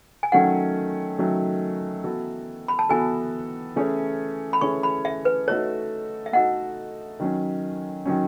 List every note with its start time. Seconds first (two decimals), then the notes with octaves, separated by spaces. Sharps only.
0.23 G#5
0.32 D#3 F#3 A3 C#4 F#5
1.18 D#3 F#3 A3 C#4
2.04 E3 B3 F#4 A4
2.68 B5
2.79 A5
2.89 E3 B3 F#4 A4 G#5
3.76 E3 A3 C#4 G#4 C#5
4.53 B5
4.61 E3 A3 C#4 G#4 C#5 C#6
4.83 B5
5.05 E5
5.25 B4
5.48 A3 D#4 F#4 A4 C#5
6.26 E5
6.33 A3 D#4 F#4 A4 F#5
7.20 D#3 F#3 C#4
8.06 D#3 F#3 C#4